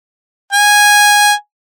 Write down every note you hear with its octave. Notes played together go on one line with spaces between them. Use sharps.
G#5